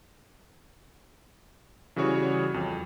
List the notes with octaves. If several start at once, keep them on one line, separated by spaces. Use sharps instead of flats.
C#3 E3 G3 F#4 G#4 C#5
F2